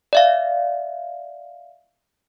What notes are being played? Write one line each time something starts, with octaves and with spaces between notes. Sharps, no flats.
D5 E5 F5